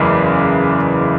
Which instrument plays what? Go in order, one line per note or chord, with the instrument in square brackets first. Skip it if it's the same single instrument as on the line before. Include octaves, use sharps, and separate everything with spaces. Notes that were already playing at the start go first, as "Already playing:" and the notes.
Already playing: [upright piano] F#1 E2 C#3 E3 G#3